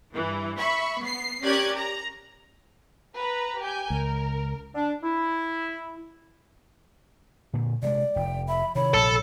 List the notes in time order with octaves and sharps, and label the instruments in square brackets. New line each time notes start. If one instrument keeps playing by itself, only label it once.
[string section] G2 E3
E5 B5 C#6
B3 C7
C#4 G4 A#4 D5 F#6 G#6
A#5
[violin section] B4 A#5
G4 G#5 G6
[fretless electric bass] C#2 [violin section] A#4
[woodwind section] D4
E4
[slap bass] A#2 D3
[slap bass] C3 G3 G#3 [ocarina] D5
[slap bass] F1 [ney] G5
[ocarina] E5 [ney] B5
[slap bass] C3 D#3 [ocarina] C#5 [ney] B5
[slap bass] A#1 C3 [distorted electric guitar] A4